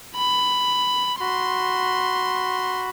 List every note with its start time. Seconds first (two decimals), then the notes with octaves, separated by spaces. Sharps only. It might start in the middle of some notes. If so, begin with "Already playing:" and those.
0.16 B5
1.20 F#4 B5 C6